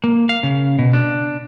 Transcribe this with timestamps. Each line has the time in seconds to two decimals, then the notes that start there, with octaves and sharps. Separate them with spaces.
0.04 A#3
0.29 F5
0.43 C#3
0.79 B2
0.93 D4